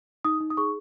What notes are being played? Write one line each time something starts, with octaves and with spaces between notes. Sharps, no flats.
D#4 D#6
D#4
D#6
G#4 C#6